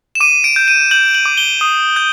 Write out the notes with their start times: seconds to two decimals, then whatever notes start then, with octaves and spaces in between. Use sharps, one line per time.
0.15 E7
0.20 D6 D#7
0.44 D7
0.56 G6
0.68 D#7
0.91 G6 F#7
1.15 F#7
1.25 D6
1.37 G7
1.61 D#6
1.96 G6